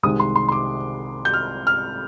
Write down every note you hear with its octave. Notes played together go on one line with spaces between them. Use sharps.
C2 C3 D#3 G#3 D#6
C6
C6
C6
D6
G6
F6
F6